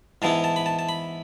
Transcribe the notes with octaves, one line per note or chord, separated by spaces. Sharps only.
G#2 E3 B3 E4 A5
A5
B5
A5
A5
B5